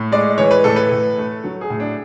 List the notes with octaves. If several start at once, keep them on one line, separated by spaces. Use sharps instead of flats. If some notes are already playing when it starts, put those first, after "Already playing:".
Already playing: A2
G#3 D5
E3 C#5
B4
A2 A4
B4
A2
A3
F#3
G#4
A2
D4